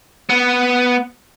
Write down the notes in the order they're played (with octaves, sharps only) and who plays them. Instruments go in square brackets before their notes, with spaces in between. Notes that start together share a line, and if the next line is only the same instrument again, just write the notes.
[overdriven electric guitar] B3